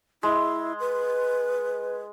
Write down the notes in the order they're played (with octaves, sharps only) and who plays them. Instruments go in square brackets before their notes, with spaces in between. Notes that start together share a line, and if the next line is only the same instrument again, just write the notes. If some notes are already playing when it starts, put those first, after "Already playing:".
[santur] G#3 [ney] E4
[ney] B4